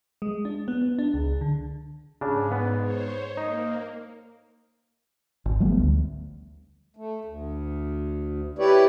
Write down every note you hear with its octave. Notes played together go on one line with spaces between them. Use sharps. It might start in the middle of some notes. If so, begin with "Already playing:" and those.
G#3
D4
B3
B3
D4
C#2
D3
G#2 C#3 D4
B3
C5 C#5
A#3 D#4
G#1
F3 G3 A3 B3
D2
A3
D2
E4 G4 B4 C#5 D5